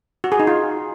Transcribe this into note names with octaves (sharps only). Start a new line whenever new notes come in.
F#4
G#4
D#4
F4